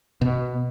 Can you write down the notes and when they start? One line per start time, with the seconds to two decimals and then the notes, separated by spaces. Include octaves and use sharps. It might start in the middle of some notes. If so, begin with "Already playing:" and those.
0.21 B2